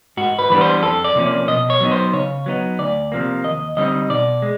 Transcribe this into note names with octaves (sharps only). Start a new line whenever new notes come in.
G#2 F#4
B4
E3 G3 B3 D4 B4
C5
F2 A4
D5
C3 F3 A#3 C#4
D5
B2 D#5
C#5
F#3 B3 D#4
C5
C#3 C#5
F#3 B3 D#4
D2 D5
C3 F3 A#3
D#2 D#5
D3 G3 C4 D#4 D#5
B2 D5
G#3